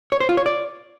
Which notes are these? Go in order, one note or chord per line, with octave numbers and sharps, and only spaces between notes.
C#5
C5
F4
C#5
D5